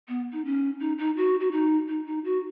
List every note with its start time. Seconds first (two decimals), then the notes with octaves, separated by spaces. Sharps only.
0.08 B3
0.33 D#4
0.45 C#4
0.80 D#4
0.98 D#4
1.17 F#4
1.40 F#4
1.52 D#4
1.88 D#4
2.07 D#4
2.25 F#4